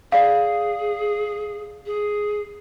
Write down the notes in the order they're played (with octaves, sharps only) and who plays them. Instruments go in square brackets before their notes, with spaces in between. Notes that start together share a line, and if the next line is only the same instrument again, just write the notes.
[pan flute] G#4 [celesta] D5 F5
[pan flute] G#4